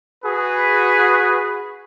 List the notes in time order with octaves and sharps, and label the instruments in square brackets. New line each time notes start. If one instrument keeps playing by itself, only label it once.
[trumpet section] F#4 G#4 B4